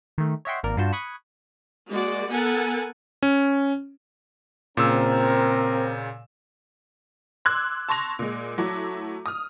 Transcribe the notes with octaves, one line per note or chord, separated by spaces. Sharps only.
D#3 A3
C#5 D#5 E5 F#5 G5 C6
G#1 A#3 A#4 D5
G2 D4 F4 F#4 G6 E7
B5 C#6 D#6 F#6 G#6
G#3 A#3 F#4 D5
B3 A4 A#4 F#5 G#5 A5
C#4
A#2 C#3 C4 A#4 E6
C6 D6 E6 F#6 G#6
A5 C6 C#6 A#6 F7
A#2 G#3
F#3 A3 E4 F#4 D6
D#6 F6